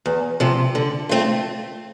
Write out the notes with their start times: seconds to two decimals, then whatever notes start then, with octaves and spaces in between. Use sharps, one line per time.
0.06 E2
0.40 C3 F3
0.75 D3
1.09 A3 C4 F4